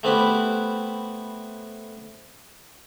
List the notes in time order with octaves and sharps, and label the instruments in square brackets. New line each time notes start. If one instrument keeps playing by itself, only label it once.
[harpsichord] A3 B3 C4 E4 G4 B4